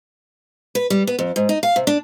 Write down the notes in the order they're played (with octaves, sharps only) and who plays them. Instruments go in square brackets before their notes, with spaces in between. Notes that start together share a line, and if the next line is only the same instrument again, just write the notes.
[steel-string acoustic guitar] B4
G3
B3
F2
G#2
D#4
F5
C3
D4